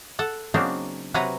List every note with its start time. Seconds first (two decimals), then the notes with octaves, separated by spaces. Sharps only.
0.19 A4 F#5
0.54 C#3 F#3 A#3 C4 D4 D#4
1.14 C3 F#3 B4 F#5 G#5 A#5